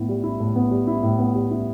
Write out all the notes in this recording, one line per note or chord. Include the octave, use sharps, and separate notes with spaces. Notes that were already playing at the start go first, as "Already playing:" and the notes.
Already playing: A2 B3 E4
G3
E4
A2
B3
G3
E4
A2
B3
G3
E4